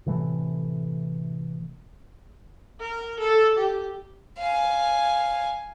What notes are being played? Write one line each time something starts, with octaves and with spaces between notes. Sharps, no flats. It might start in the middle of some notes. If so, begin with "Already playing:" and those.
A2 C3 E3 A3
A#4
A4
G4
F5 G#5